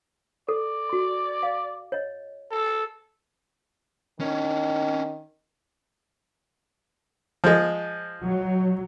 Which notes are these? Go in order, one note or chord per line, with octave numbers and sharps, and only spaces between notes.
A4 D5
F#4 C6
F5
C#5 D#5
A4
D#3 C#4 D4
F3 G#3
F#3